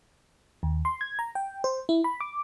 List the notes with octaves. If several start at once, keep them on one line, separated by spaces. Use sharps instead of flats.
D#2
C6
G#6
A#5
G5
C5
E4
B5
D6